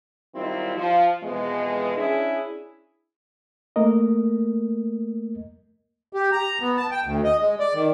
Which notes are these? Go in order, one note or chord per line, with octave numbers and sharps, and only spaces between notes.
D#3 F#3 G3 C4 E4 F4
F3
F2 B2 E3 G#3
C#4 D4 E4 G#4
A3 A#3 A#4 D#5
G4
A#5
B3
A5
G5
D2
D#5
G#3
D5
D#3